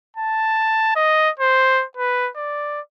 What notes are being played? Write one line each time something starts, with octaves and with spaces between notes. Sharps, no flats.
A5
D#5
C5
B4
D5